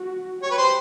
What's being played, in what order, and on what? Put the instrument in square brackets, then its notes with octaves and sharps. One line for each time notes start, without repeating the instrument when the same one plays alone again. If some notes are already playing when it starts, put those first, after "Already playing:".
Already playing: [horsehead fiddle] F#4
[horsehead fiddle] G4 [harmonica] C#5
[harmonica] B4
C5